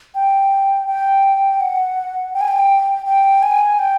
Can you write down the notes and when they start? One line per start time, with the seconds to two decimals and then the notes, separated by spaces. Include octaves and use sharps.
0.15 G5
0.88 G5
1.60 F#5
2.34 G5
2.41 G#5
2.48 G5
3.06 G5
3.43 G#5
3.79 G5